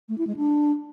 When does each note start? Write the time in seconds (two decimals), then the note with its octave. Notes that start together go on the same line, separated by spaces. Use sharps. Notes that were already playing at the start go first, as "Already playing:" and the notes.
0.09 A3
0.18 E4
0.27 G#3
0.36 D4